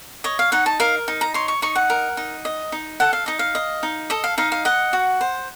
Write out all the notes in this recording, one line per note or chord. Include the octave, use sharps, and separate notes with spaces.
C#5 D#5
F5
D#4 F#5
A5
A#4 F5
D#4
A#5
C#5 C6
C#6
D#4 C#6
F#5
A#4
D#4
D#5
D#4
A4 F#5
F5
D#4 D#5
F5
D#5
D#4
A4 D#5
F5
D#4 F5
F5
D#5 F#5
F#4
C5